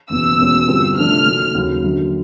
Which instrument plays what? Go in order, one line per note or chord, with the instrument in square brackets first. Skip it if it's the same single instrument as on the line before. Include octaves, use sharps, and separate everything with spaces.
[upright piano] F#1 E2 B2 [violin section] E6
[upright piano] E2 B2 G#3 C#4 F#4
G2 D3 G3 C4 F4
[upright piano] C3 F3 A3 D4 [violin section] F6
[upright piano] F#1 F#2 D#3 F#3 A3
D#2 C#3 F#3
F#2 D3 F#3